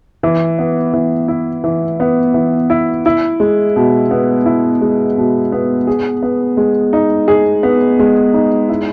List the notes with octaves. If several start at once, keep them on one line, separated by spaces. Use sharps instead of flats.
E3
B3
E3
E4
E3
B3
E3
E4
E4
G#3
B2
B3
E4
G#3
B2
B3
G#4
B3
G#3
D#4
G#4
B3
G#3
D#4
E4